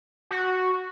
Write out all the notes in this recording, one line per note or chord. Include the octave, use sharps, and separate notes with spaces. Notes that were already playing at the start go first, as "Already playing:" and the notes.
F#4